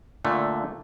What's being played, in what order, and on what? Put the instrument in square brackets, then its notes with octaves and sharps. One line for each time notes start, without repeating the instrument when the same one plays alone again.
[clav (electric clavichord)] A#2 D3 A3